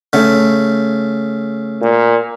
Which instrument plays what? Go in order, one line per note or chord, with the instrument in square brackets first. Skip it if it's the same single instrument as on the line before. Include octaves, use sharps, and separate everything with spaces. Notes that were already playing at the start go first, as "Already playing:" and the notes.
[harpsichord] C#3 A3
[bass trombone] A#2